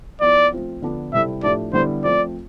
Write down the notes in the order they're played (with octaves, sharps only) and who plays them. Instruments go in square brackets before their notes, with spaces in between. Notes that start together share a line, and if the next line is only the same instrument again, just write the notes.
[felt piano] F3 B3 E4 [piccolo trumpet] D5
[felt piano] F3 A3 C4 F4
D3 F3 B3 D4 F4
[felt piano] C3 G3 C4 E4 A4 [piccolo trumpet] E5
[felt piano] A2 F3 A3 D4 G4 [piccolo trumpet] D5
[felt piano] D3 G3 B3 E4 [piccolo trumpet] C5
[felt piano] F3 A3 C4 [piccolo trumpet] D5